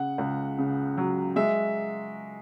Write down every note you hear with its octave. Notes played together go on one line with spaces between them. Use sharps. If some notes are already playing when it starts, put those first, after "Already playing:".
Already playing: C#3 F#5
C#2
C#3
F#3
G#3 E5